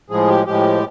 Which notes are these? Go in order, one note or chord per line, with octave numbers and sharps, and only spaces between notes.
A2 F3 G#3 G#4
G4
A2 F3 G#3 G4